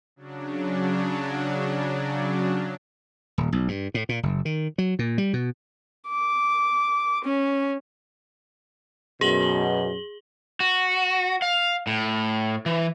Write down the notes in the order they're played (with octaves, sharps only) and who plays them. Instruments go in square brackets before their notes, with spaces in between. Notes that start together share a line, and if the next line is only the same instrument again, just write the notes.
[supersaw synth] C#3 F#3 D4
[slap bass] D#1
B1
G2
A2
A#2
F#1
D#3
F#3
A#2
G3
B2
[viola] D6
C#4
[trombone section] F#2 B2 [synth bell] G#4 F#7 G7
[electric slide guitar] F#4
F5
A2
E3